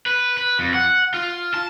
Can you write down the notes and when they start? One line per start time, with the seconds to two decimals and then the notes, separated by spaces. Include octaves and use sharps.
0.06 B4
0.37 B4
0.59 F2
0.74 F#5
1.14 F4
1.54 A5